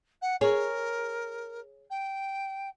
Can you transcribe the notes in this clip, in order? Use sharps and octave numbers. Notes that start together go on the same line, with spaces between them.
F#5
G#4 A#4 C#5
G5